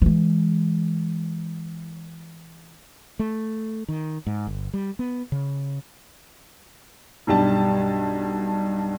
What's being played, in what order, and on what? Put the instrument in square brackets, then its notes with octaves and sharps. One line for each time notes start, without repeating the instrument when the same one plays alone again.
[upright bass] E3 G#3
[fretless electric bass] A3
D#3
G#2
G1
G3
B3
C#3
[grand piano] B1 G2 G3 A5